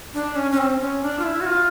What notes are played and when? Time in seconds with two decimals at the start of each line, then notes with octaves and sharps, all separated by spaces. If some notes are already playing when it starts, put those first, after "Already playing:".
0.14 D4
0.36 C#4
0.51 C#4
0.58 C4
0.80 C#4
1.02 D4
1.19 F4
1.23 E4
1.41 F#4
1.46 F4